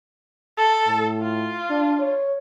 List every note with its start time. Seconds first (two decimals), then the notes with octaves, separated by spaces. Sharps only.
0.57 A4
0.87 A2
1.20 F4
1.70 D4
2.00 C#5